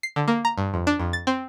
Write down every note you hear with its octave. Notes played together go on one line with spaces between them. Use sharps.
C7
D3
A#3
A#5
G2
F2
D4
F2
A6
C4